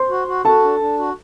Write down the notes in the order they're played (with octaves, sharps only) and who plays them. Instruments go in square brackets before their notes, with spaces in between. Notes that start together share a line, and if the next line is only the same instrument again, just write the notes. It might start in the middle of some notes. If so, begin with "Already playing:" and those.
Already playing: [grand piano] C5 C6
[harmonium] F#4
F#4
[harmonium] F#4 [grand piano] A4 A5
[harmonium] D4
D4
F#4